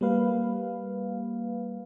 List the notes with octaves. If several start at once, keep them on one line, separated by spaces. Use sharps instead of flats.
G3 A#3 B4 F5